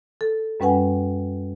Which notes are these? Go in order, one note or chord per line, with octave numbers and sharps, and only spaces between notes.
A4
F#2 G3 C#4 B4 F#5 G#5